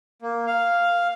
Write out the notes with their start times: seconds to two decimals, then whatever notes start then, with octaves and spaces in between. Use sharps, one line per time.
0.22 A#3
0.47 F5